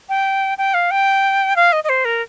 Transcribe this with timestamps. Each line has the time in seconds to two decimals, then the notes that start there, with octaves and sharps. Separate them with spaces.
0.09 G5
0.58 G5
0.74 F5
0.91 G5
1.56 F5
1.72 D#5
1.84 D#5
1.89 C5
2.05 A#4